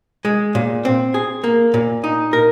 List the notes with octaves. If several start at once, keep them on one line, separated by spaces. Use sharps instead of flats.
G#3
A#2
C4
G#4
A#3
A#2
D#4
A#4